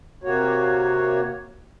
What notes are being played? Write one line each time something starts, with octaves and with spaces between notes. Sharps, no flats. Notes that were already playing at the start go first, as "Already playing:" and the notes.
C3 A#3 F#4 C#5